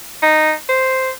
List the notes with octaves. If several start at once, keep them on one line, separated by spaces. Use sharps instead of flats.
D#4
C5